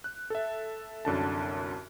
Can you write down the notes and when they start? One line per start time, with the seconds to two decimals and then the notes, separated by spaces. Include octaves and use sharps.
0.04 F#6
0.30 A4 E5
1.05 C2 F#2 D3 A5